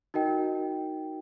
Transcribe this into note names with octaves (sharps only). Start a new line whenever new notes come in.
D#4 F#4 A#4 D#5 G5